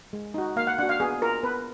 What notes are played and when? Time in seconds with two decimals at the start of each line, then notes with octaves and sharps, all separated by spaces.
0.13 G#3
0.34 D#4 F#4
0.56 A#3 F5
0.67 F#5
0.78 D4 F#4 F#5
0.89 F5
1.00 B3 G#4
1.22 F4 A#4
1.43 B3 B4